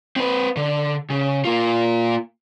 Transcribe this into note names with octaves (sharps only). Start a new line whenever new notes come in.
C4 B4
D3
C#3
A#3 F4